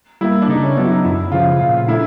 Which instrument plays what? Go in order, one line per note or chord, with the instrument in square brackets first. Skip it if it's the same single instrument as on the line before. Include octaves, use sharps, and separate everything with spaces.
[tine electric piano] G3 A#3 [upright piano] E4
[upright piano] D4
[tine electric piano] C#3 [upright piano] D#4
[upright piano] C#4
[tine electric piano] F#3 B3 [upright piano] D4
[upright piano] E4
D#4
[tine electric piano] F#2 [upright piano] E4
[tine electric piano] C#3 F3 [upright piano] F4
[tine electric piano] A#2 [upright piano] F4
[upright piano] F4
[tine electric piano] A3 D4 [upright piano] E4